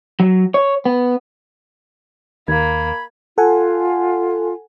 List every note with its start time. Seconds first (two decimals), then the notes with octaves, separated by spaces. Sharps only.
0.20 F#3
0.54 C#5
0.85 B3
2.48 D#2 A#3 B5 G#6
3.38 F4 A4 F#5 G#5